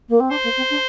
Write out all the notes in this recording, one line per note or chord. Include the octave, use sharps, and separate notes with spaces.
A#3
C4
D4 C5
A#3
C4
D4